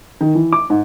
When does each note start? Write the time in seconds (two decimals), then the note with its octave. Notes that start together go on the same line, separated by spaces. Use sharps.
0.21 D#3
0.35 E3
0.52 D6
0.70 G#2